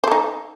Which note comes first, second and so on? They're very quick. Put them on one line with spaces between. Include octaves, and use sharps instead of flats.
C5 A4 D#4